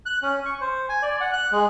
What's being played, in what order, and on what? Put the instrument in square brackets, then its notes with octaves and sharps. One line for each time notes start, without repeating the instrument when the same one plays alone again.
[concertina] F#6
C#4
C#6
C5
G#5
D5
F#5
F#6
G#3